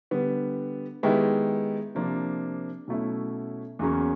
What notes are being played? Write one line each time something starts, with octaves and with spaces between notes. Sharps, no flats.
D3 G3 B3
D#3 G#3 B3 E4 G4
C3 F3 A#3 D4
B2 F#3 A3 C#4 E4
E2 C#3 F#3 A#3 C#4